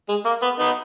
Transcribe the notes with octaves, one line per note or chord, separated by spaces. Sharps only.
G#3
A#3
B3
B3 D#4